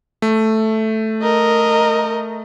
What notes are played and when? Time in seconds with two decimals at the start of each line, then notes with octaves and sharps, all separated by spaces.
0.22 A3
1.23 A#4 D#5